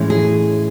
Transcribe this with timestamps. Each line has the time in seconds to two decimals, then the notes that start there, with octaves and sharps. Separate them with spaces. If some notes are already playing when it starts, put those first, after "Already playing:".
Already playing: A2 E3 G#3 C#4
0.10 G#4